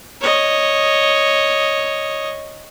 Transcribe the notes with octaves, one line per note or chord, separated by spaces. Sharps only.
C#5 D#5